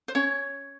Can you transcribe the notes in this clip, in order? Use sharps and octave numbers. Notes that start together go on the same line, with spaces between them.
C5
C#4 C#5